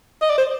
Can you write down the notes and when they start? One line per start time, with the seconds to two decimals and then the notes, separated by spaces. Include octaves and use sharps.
0.22 D#5
0.30 D5
0.38 C5